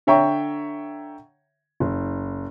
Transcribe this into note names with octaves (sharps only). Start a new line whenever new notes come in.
D3 C#5 E5 G5 A#5 C#6
F#1